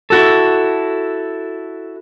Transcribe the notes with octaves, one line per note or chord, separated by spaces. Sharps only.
E4 F#4 A4